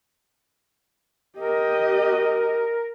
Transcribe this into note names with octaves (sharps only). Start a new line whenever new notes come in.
G4 A#4 D#5